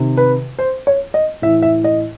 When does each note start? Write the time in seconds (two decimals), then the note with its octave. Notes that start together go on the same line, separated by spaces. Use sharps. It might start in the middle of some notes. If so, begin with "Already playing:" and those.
Already playing: C3 D#3
0.17 B4
0.59 C5
0.87 C#5
1.14 D#5
1.42 A2 E3 E5
1.62 E5
1.84 D#5